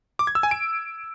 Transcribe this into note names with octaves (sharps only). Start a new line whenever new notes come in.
D6
G#6
E6
G#5
D7